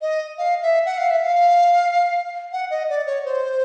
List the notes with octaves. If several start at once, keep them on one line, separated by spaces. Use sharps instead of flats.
D#5
F5
E5
F#5
F5
E5
F5
F#5
D#5
D5
C#5
C5